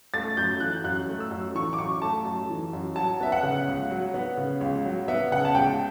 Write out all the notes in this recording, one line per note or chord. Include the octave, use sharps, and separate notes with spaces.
A3 A6
F#2 G6
E3 F#6
F#2 F#6
A3
E6
F#2
E3 C#6
D6
F#2 C#6
A3 A5
F#2
E3
F#2
F#3 A5
B3 E5
F#5
C#3
C#2
F#3
B3
C#3
C#2
F#3
B3 E5
C#3 F#5
A5
C#2 G5